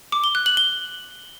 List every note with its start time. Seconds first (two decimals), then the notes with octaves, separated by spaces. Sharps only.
0.12 D6
0.24 G7
0.35 F#6
0.46 F#7
0.57 G7